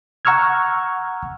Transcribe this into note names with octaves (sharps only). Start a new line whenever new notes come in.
F#5 A#5 C#6 E6 F6 G#6